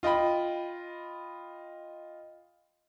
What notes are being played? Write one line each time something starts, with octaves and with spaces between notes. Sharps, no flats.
F4 D#5 G5 B5